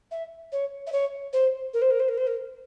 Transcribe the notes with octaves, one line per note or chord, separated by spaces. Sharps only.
E5
C#5
E5
C#5
C5
A#4
C5
A#4
C5
A#4
C5
A#4